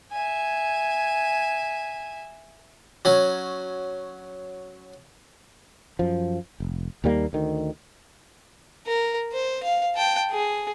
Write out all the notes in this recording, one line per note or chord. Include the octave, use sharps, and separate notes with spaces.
E5 G#5
F#3 C#4
F#2 F3
F1
D#2 D#3 G3 A#3
D2 D#3
A#4
C5
F5
G5 A5
G#4